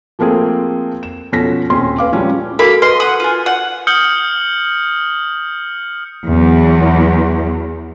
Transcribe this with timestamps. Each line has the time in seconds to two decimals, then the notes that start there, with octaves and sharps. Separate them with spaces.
0.19 F3 A3 A#3 C4 G#4
1.03 E7
1.32 B2 F3 C#4 A4 A#6 B6
1.70 D#1 C4 C#4 C6
1.98 B4 F5 D6
2.12 F3 G3 G#3 C#4 E4
2.59 A#3 F#4 A4 A#4 B5
2.82 B4 D#5 C6
3.00 F#5 D#6
3.20 F4 G#5
3.46 F#5
3.87 D#6 F6 G6 C#7 F#7 G7
6.29 E2 F#3